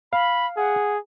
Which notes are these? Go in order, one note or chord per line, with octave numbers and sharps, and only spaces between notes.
F5 B5
G#4 F#5